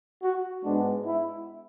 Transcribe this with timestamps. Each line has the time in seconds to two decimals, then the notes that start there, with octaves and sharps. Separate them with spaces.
0.23 F#4
0.65 G#2 G#3 B3 D4
1.06 E4